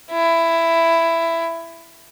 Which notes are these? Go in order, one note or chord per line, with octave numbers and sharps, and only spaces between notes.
E4